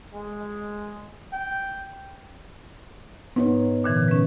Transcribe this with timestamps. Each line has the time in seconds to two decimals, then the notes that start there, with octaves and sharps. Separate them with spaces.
0.14 G#3
1.33 G5
3.36 G#2 B3 D#4 C#5
3.84 A#2 D3 E3
4.08 C#4 B4